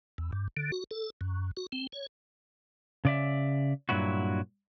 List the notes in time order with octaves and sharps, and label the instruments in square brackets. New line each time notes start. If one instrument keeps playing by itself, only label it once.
[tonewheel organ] E2
G2
D3
F#4
A4
F#2
F#4
C4
C#5
[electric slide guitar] C#3 D5 E5
G2 A#2 F#3 E4 F#4